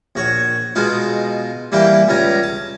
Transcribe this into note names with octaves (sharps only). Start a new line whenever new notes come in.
A#1 F#4 C#5
B2 G#3 B3 D#4 F4
E3 G3 A#3 E4 G4
C#2 G3 C#4 A#5
A5